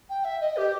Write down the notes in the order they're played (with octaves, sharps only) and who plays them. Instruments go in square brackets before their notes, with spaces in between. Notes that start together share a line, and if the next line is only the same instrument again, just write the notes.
[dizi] G5
E5
D#5
G4